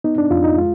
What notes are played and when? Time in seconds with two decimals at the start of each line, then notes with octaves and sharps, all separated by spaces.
0.04 B3 D#4
0.18 D4
0.31 F2 F4
0.44 D#4
0.58 G#3 F4